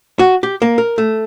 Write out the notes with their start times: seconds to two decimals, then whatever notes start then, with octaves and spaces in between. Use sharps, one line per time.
0.19 F#4
0.43 G4
0.62 A#3
0.78 A#4
0.98 A3